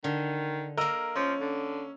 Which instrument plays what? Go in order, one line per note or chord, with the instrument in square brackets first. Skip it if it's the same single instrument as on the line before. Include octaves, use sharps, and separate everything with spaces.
[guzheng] D3 [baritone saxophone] D#3
[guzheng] A#3 D#5 [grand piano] A#4 E6
[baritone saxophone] F3 [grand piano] C#4
[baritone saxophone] D3